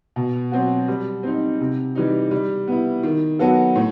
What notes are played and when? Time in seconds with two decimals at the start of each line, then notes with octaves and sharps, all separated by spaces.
0.16 B2
0.52 F#3 C4 F#4
0.88 G3
1.23 C4 D#4
1.60 C3
1.95 E3 G3 D#4
2.31 G3
2.67 B3 E4
3.03 D#3
3.39 F#3 B3 F#4 A4
3.76 A2